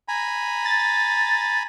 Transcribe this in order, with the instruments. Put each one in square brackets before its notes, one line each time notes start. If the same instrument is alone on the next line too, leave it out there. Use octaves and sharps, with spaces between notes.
[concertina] G#5 A#5 B5
[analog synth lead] A6